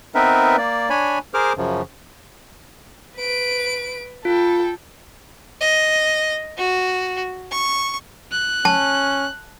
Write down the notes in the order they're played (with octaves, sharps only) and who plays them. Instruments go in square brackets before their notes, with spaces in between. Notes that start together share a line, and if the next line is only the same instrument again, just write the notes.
[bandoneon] B3 C4 D#4 A#4 B4 E5
A#3 D5
D4 C#5 G#5 B5
G#4 A#4 C5 D6 F6
F#2 C#3 F3
[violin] B4 D7
[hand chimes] F4 [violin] A4 G5
[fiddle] D#5
F#4
C#6
[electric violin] F#6
[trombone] C#4 [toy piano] A5